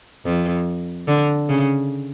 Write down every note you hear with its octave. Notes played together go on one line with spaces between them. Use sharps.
F2
D3
C#3